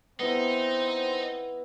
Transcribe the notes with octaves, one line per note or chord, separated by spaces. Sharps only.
B3 C4 D#4 E4